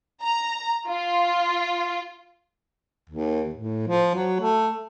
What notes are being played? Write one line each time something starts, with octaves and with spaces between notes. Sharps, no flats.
A#5
F4
D#2
A2
F3
F#3
A3